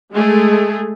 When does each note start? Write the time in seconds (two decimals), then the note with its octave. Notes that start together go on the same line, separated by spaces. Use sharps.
0.12 G#3 A3 G#4